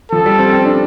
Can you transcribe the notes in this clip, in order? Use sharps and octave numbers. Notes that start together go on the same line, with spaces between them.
F3 A4
G3
C4
C4
D4